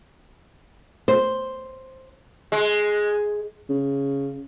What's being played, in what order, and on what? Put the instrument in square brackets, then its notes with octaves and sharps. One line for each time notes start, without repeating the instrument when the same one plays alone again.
[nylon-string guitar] C5
[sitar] G#3
[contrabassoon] C#3